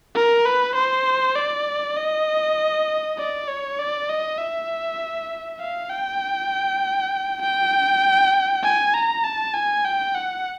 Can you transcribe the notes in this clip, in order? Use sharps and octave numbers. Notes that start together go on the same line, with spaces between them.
A#4
B4
C5
D5
D#5
D5
C#5
D5
D#5
E5
F5
G5
G5
G#5
A#5
A5
G#5
G5
F#5